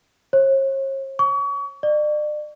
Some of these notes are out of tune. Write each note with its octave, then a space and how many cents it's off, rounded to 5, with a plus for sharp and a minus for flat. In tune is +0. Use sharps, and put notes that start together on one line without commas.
C#5 -45
C#6 +35
D5 +35